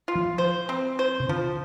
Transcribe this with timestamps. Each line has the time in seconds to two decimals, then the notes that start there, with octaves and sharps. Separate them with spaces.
0.08 F4
0.15 F3
0.38 C5
0.69 C4
0.99 C5
1.20 C3
1.29 D3 F3